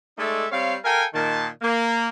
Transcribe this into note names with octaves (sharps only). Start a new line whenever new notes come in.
G#3 A3 D#4 A4 D5 E5
G3 C4 C#5 F5
A4 A#4 F5 G5 G#5
A#2 D#3 A5
A#3